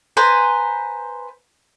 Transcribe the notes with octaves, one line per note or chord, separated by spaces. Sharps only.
B4 C5 G#5 A#5